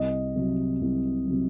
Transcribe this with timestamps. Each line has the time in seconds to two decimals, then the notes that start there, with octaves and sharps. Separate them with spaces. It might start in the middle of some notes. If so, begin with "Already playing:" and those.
Already playing: C2 D#5
0.36 C3 F#3
0.81 C2
1.27 C3 F#3